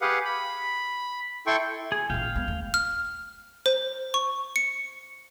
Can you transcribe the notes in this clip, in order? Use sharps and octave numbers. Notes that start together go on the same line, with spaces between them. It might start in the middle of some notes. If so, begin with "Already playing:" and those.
G4 G#4 B4 F5 F#5
B5
E4 A4 G5 C6 C#6
G#4
A1 A#2 F5 G5
G3 B3
D#2 A3
F6
C5
C#6
C#7